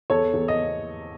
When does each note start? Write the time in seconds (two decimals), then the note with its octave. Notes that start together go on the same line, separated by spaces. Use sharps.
0.10 E2 A4 C#5
0.34 E2
0.48 D#5